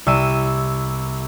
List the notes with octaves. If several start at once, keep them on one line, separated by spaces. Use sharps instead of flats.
C2 E6 D#7